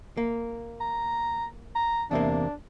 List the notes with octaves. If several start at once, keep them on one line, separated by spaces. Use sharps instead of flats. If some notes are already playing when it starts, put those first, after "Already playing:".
A#3
A#5
A#5
E2 C3 A#3 D4